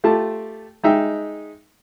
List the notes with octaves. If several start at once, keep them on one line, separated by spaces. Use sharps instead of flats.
A3 F4 G4 A5
G#3 D#4 E5 G5